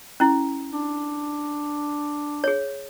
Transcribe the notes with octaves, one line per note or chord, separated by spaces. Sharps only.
C#4 E4
D4
G#4 C#5